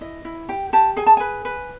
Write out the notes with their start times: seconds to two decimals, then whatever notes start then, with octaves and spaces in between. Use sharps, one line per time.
0.01 E4 D#5
0.25 E4
0.49 G4 G5
0.73 G4 A5
0.97 G#4 G#5
1.06 A5
1.17 B4 G#5
1.45 B4